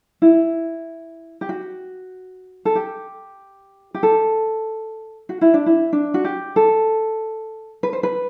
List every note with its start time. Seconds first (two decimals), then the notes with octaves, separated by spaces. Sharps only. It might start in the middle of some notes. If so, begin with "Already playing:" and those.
0.22 E4
1.41 G4
1.49 F#4
2.65 A4
2.75 G4
3.94 G4
4.03 A4
5.29 F#4
5.41 E4
5.54 D4
5.66 E4
5.93 D4
6.14 F#4
6.24 G4
6.56 A4
7.83 B4
7.93 C5
8.03 B4